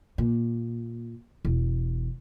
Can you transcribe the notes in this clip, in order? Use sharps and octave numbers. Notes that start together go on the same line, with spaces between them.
A#2
E1